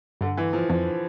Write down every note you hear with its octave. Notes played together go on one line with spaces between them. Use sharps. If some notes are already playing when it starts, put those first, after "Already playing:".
G2 D3
E3
F3
F2 F3